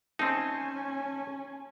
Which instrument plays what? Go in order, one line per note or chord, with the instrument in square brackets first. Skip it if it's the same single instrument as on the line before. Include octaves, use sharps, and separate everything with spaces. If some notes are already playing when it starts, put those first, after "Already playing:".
[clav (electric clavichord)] C4 D#4 [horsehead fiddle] C#4 G#5 [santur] A5 C6